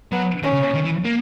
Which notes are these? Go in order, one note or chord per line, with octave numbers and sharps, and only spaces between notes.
F#3 B3
D#3 C#4
C#3
D#3
E3
A#3